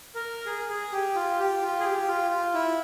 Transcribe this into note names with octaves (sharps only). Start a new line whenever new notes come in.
A#4
G#4
G#4
G4
F4
G4
F4
G#4
G4
F4
F4
E4